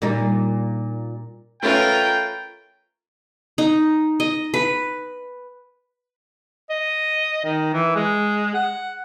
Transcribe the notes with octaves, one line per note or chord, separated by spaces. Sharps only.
A#2 G3 D#4
A3 C#4 F4 A#4 B4 G5
D#4
D#5
B4
D#5
D#3
E3
G#3
F#5